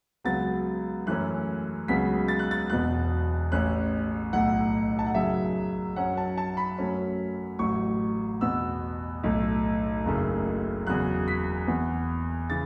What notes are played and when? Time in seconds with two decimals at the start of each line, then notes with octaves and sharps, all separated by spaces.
0.24 C#2 C#3 F#3 B3 A6
1.07 F#2 E3 A3 C#4 F#6
1.88 C#2 C#3 F#3 B3 B6
2.28 A6
2.39 F#6
2.51 A6
2.70 E1 E2 B2 B3 F#6
3.51 A1 A2 A3 C#4 F#6
4.33 B1 A2 A3 F#5
4.99 A5
5.06 F#5
5.14 F#2 C#3 F#3 E5
5.96 F#2 F#3 C#4 F#5
6.17 A5
6.37 A5
6.57 B5
6.78 F#2 F#3 A3 C#4
7.59 A1 A2 F#3 C#6
8.41 E2 B2 B3 E6
9.24 B1 A2 A3
10.04 F#1 F#2 C#3 A3
10.86 E2 C#3 F#3 F#6
11.28 B6
11.67 E2 E3 B3
12.50 C#3 E3 A6